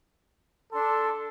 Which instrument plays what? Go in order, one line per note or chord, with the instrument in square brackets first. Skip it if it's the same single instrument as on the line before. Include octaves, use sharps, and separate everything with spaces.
[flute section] D4 A5 C6 [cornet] A4